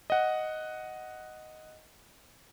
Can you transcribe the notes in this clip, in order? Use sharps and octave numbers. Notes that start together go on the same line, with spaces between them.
D#5 F#5